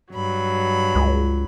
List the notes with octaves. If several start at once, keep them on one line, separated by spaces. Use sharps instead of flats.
G2 F#3 B5
C#2